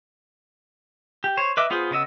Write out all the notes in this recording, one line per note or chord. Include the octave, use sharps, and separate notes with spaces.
G4
C5 C#5
B4 D#5 E5 D6 E6
B3 F4 G#4 C5
C#3 B3 D#5 E6